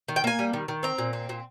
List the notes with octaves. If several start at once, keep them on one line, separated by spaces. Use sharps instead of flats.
D#3
G5
A#3 G#5
G3
D#3
D#3
C4 A#5
A#2
C4
A#2